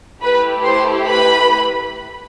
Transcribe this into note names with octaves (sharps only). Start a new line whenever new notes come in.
A3 E4 G4 B4 B5
C5 C6
B4 B5